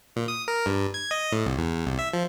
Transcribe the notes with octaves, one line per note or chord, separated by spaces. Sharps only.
A#2
D#6
A#4
G2
G#6
D#5
A2
C2
E2
C2
E5
F3